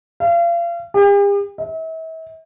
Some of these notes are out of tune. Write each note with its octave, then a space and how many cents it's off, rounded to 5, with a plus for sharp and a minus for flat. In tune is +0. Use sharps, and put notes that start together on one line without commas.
F5 -35
G4 +45
E5 -40